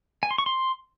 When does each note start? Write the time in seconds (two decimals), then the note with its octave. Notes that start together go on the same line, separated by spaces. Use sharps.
0.23 G#5
0.31 C6
0.38 C#6
0.46 C6